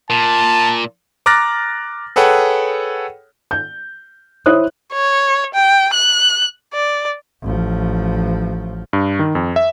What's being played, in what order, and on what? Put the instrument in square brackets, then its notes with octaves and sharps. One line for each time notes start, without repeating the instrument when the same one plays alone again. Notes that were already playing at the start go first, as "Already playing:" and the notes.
[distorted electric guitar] A#2 [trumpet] A5
[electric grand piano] A#5 D6 F6 F#6 A6 A#6
G#4 A4 B4 C#5 F#5 G5
[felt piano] G6
E4 C5 C#5 D#6 F#6
[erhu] C#5
G5
F#6
D5
[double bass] A1 F3
[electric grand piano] G2
D#3
F2
E5